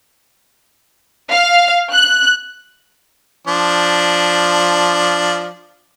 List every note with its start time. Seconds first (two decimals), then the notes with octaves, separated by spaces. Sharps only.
1.32 F5
1.93 F#6
3.47 F3 D4